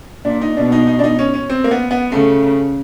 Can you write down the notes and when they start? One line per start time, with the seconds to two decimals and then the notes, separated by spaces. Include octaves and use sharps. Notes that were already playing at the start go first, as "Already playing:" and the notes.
0.25 A#2 D4
0.41 D#4
0.56 B2 D4
0.72 D#4
0.87 D#4
0.99 D4
1.04 D#4
1.19 C#4
1.34 C#4
1.50 C4
1.64 A#3
1.71 B3
1.91 B3
2.11 C#3 A3